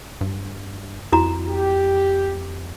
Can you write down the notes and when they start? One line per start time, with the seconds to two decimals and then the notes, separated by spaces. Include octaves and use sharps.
0.21 G2
1.12 F2 E4 F#4 A#5
1.49 G4